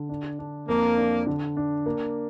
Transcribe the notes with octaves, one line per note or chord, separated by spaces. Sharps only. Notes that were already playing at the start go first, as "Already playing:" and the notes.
Already playing: D3
D4
D4
F2 A#3
D4
D3
D4
A#3